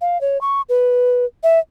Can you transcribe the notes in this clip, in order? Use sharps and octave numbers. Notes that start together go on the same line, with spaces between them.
F5
C#5
C#6
B4
E5